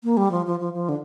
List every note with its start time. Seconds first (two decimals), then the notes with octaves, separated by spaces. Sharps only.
0.04 A#3
0.17 G3
0.31 F3
0.46 F3
0.60 F3
0.73 F3
0.89 D3